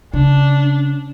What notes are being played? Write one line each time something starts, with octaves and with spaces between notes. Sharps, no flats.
C#3 D4